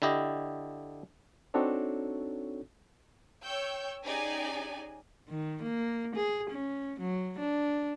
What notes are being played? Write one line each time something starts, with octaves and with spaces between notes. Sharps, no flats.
D3 E4 G4 D#5
C4 D4 D#4 F#4 A4 C#5
C#5 G5 C#6 E6 G6
C#4 D#4 G4 G#4 D5 G#5
D#3
A#3
G#4
C#4
F#3
D4